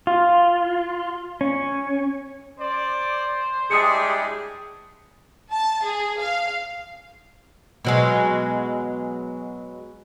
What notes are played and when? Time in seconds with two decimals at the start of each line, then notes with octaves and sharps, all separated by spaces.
0.07 F4
1.41 C#4
2.60 C5 D5
3.71 G3 G#3 D4 E4 G4 G#4 D#6 C#7
5.52 A5
5.82 G#4
6.19 F5
7.85 B2 F#3 G#3